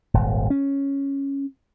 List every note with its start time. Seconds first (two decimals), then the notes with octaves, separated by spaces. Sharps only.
0.14 D#1 G#1
0.50 C#4